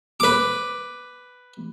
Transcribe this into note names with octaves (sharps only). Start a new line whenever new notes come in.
B4 D6